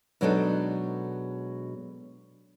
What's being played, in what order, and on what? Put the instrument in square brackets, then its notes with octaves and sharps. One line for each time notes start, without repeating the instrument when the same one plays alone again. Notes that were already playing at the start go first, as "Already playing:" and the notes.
[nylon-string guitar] B2 F#3 G#3 D4 D#4 A4